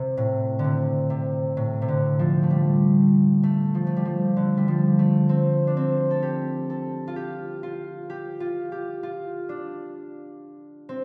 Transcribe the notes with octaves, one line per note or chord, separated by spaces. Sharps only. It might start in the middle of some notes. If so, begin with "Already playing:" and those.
Already playing: C3
A2
D3
C3
C3
A2
C3
D3
F3
A3
G3
A3
F3
A3
G3
F3
D3
G3
F3
A3
C4
D4
C4
A4
G4
A4
F4
G4
F4
G4
F4
G4
F4
D4
C4